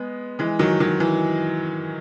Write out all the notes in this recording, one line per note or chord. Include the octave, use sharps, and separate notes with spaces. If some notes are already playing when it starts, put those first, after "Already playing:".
Already playing: G#3 B3
E3 G#3
D#3 F#3
D#3 F#3
E3